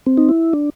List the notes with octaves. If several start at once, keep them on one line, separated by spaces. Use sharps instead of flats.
C4
D#4
E4
D4